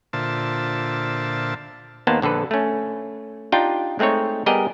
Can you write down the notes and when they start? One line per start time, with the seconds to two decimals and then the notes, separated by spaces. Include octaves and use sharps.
0.13 A#2 D3 F4 C5 E5 A5
2.07 D#2 A#3 B3 C5 A5
2.22 A#1 D3 A4 B4
2.51 A3 C#4
3.52 D4 D#4 F4 G4 G5
3.99 G#3 A3 C4 D#4 C#5
4.46 G3 B3 G4 G#4 A#4 D#5